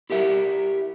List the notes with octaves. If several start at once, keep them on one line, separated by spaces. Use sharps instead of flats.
E4 G4 A#4 E5